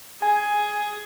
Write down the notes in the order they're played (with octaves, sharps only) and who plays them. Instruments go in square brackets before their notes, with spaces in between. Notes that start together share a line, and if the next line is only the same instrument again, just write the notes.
[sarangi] G#4 [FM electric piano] G#5